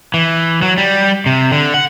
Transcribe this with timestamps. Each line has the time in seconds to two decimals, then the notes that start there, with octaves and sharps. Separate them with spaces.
0.14 E3
0.62 F#3
0.78 G3
1.26 C3
1.52 D3
1.74 F#5